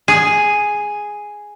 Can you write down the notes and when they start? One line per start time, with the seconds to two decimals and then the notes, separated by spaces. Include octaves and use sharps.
0.08 G#4